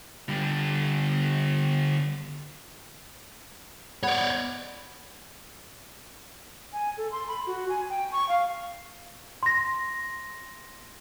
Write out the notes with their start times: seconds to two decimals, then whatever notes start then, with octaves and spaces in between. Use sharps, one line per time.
0.29 D3 G3
4.03 B3 C#5 D5
6.73 G#5
6.97 A4
7.12 C6
7.28 B5
7.47 F#4
7.69 G#5
7.90 G5
8.12 C#6
8.29 F5
9.43 C6 A#6